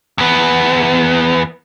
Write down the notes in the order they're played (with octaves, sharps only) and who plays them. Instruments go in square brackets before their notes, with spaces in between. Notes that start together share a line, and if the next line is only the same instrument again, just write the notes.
[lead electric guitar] E2 B3